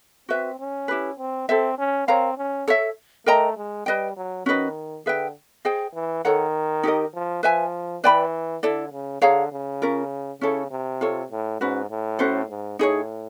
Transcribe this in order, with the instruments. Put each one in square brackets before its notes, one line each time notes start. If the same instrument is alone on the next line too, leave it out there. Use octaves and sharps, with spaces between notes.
[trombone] C4 [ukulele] F#4 B4 E5
[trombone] C#4
[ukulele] E4 G4 B4
[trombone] C4
[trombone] C4 [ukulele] A4 C5 E5
[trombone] C#4
[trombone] C4 [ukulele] A#4 C#5 F5 A#5
[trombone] C#4
[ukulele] A4 C#5 E5
[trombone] A3 [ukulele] A#4 D#5 G5 A#5
[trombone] G#3
[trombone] G3 [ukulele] B4 D#5 G5
[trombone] F#3
[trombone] D#3 [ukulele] C#4 F#4 B4 D#5
[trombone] D3 [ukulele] G#4 B4 E5 G5
[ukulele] G#4 C5 D#5 G5
[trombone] E3
[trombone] D#3 [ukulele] A4 C#5 F#5 A#5
[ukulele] D#4 G4 A#4 D#5
[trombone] F3
[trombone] F3 [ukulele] B4 E5 G#5
[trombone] E3 [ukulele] B4 D5 G5 B5
[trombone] D3 [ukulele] E4 A4 D5
[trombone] C#3
[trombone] D3 [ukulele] G#4 C#5 F5 A#5
[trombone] C#3
[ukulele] C#4 F4 A#4
[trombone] C#3 [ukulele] C#4 E4 A4 C#5
[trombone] C3
[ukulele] F4 A4 C#5
[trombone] A2
[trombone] G#2 [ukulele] C#4 F#4 B4
[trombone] A2
[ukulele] C#4 F#4 A4 C5
[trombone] G#2
[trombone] A2 [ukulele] D#4 G#4 C#5